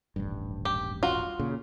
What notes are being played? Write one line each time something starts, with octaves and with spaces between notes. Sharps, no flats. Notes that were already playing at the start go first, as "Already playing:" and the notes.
D#1 A1 G2
G4
F4 F#4
A#2 C#3